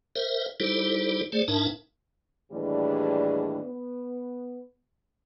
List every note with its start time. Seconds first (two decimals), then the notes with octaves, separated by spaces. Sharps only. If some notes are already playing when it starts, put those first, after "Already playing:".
0.16 A#4 C5 E5
0.60 G3 D#4 E4 G4 A4 C5
1.32 A3 G#4 C5 D5
1.48 G#2 D4 D#4 A#4 E5 A5
2.52 D#2 A2 E3 G3 D4 G#4
3.63 B3